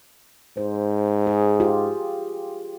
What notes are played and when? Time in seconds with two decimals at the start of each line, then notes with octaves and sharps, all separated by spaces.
0.57 G#2 C5
1.27 G#4
1.60 F4 G4